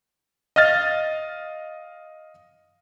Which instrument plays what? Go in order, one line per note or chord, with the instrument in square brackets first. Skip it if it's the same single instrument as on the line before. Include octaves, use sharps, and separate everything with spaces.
[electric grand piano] D#5 F5 F6 A6